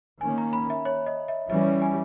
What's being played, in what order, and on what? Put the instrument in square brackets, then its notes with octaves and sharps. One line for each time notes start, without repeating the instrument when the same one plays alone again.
[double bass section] D#3 A#3 C#4 [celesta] G#5
[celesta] A#5
B5
E5
C#5
D#5
E5
[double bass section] E3 G3 C#4 [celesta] E5
[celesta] G#5